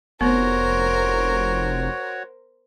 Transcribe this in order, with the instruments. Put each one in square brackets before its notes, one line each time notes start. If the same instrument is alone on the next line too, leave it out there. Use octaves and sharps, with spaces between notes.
[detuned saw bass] F1 [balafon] B3 [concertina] F#4 C#5 [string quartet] A#4 C5